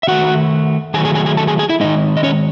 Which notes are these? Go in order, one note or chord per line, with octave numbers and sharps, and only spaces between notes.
E5
D#3 A3 F#4 F#5
D#3 F#3 A3 G#4 G#5
G#4 G#5
G#4 G#5
G#4 G#5
A4 A5
G#4 G#5
G#4 G#5
E4 E5
D#3 G#3 D#4 D#5
D#5
C#4 C#5